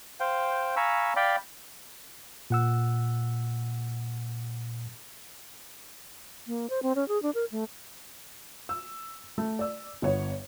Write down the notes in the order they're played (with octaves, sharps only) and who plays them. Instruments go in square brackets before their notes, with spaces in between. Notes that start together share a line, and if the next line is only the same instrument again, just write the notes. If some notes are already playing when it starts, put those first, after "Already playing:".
[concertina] C5 F5 G5
F5 G#5 A#5 B5 C#6 E6
D5 F5 G5 B5
[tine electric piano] A#2 F#5 E6
[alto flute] A#3
C5
C4
C#4
G#4
D4
A#4
A3
[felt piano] E6
A3
D5 E6
G1 B3 C#5